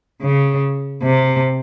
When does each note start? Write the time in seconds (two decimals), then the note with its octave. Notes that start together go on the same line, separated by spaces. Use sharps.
0.22 C#3
1.03 C3